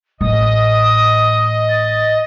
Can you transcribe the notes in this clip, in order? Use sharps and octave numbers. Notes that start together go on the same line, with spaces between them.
A1 D#5 D#6
A6